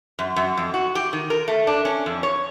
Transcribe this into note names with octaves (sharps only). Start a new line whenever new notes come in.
F#2
F#2
F2
F#4
G4
D#3
A#4
A3
D4
C#4
F2
C#5